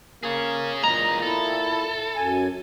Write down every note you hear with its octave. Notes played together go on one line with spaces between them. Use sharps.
A#3 G#4 C#5
E2 A#2 D#5 A#5
E4 A4
F#2 G#5